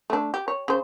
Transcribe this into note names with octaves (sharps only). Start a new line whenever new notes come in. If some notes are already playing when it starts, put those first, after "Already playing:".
A3 D4
G4
C#5
C#3 C5